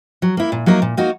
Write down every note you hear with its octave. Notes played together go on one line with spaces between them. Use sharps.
F#3
A#3 E4
A#2
F#3 A#3 D#4 A#4
A#2
A#3 D#4 F#4